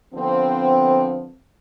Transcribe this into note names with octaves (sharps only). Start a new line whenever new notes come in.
D3 F3 B3 C4